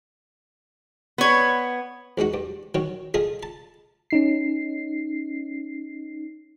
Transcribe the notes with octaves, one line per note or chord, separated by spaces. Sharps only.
B3 C#5
E2 G#3 D#4 F#4
G2
D#3 F#3 C#5
F4 G#4 A4 D#5 G#5
A5
C#4 D#4 C7